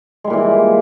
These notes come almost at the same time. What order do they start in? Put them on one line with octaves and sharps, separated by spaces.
G#3 G3 A#2 E3